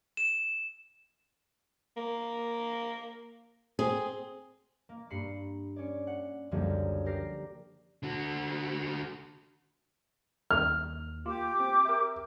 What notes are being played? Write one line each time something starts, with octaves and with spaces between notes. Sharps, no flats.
E7
A#3
C4 G#4
A#3
G2 A#3 B5 C7 C#7
C#4 C#5 D5
F#5
C#2 F#2 D3 F3 G3 A#3
G4 A#4 A#6 C7
D3 F#4
D#2 F6
A#3 F4 G4 D6
C4
A#4 E5